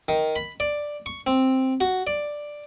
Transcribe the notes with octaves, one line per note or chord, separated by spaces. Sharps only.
D#3
B5
D5
C#6
C4
F#4
D5